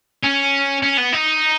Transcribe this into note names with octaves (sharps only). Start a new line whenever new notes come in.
C#4
C#4
B3
D#4